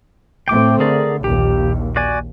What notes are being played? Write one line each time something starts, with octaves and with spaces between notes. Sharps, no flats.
A2 A3 C4 G5 D6
D3 G#4 A#4 D5
A#1 D#2 G4
F#4 D5 G#5